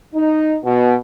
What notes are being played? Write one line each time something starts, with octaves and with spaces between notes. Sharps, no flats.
D#4
B2